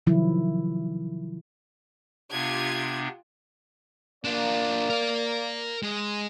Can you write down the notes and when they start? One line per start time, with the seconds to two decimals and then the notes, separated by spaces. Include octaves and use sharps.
0.07 C3 D#3 F3 F#3 E4
2.32 C3 B3 D4 F4 G4 G#6
4.25 A#3 D4 F4 D5
4.90 A#4 F5
5.83 G#3